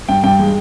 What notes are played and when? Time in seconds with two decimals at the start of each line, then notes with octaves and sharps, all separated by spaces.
0.09 G2 G5
0.23 G2 G5
0.39 G#3